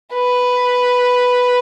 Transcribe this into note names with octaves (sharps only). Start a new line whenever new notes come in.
B4